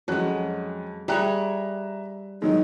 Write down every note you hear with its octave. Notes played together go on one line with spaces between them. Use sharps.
F2 F#3 G#3 C#4 F#6
G3 G#4 C#5 E5 A#5 F#6
D#3 F#3 G#3 D#4